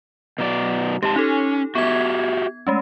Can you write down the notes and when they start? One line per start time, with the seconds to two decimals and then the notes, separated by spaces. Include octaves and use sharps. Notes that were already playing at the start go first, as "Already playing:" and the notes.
0.38 B2 F#3 D5
1.03 G#2 C3 G4 A5
1.16 C#4 D#4 A4
1.75 B3 F#4 G4 E5 G#6
2.67 G#3 A3 C#4